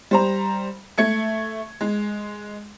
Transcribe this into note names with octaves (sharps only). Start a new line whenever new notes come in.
G3 C5 A#5
A3 G#6 C#7
G#3